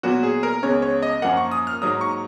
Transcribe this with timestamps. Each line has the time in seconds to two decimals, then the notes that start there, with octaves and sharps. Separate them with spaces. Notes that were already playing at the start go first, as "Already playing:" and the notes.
0.03 A#2 F#3 B3 F#4
0.23 G#4
0.43 A#4
0.63 C#2 C#3 G#3 B3 C#5
0.82 C#5
1.02 D#5
1.22 F#2 F3 A#3 F#5
1.37 C#6
1.51 D#6
1.67 F6
1.82 G#2 F#3 A#3 D#6
2.01 C#6